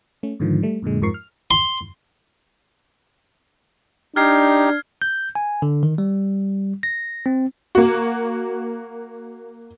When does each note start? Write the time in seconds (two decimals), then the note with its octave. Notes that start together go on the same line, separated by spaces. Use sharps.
0.23 A3 C#4
0.40 G#2 D3 D#3 F3
0.63 G3 A3
0.82 F#2 A#2 D3 G#3
1.01 F2 G#2 F3 A#4 C#6 C7
1.14 F6
1.51 C6
4.16 D4 D#4 G4 F6 G#6 C7
5.02 G6
5.35 G#5
5.62 D3
5.83 D#3
5.98 G3
6.83 A#6
7.26 C4
7.75 A#3 F#4